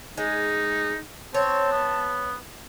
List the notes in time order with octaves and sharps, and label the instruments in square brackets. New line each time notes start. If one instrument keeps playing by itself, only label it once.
[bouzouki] G#3 [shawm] D#4
[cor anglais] C4 [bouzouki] C#5 [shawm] A5
[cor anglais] B3